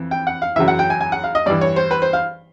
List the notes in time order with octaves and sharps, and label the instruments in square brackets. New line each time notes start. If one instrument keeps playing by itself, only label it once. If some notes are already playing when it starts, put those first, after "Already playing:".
Already playing: [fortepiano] F2 E3
G5
F#5
F5
F#2 C#3 E3 E5
F#5
G5
G#5
G#5
F#5
F5
D#5
G2 E3 D5
C#5
C5
B4
C5
F5